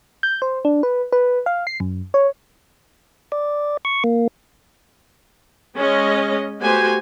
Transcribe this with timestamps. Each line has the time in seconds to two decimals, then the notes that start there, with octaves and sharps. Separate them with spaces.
0.23 G6
0.42 C5
0.65 D4
0.83 B4
1.12 B4
1.46 F5
1.67 C7
1.80 F#2
2.14 C#5
3.32 D5
3.85 C#6
4.04 A#3
5.76 G#3 C#4 D#5
6.60 A3 B3 F#4 G4 C5 G#5